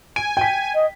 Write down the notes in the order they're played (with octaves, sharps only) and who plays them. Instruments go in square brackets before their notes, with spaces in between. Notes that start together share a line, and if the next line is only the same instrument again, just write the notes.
[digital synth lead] G#5 [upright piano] D7
[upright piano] G5 B6
[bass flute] D#5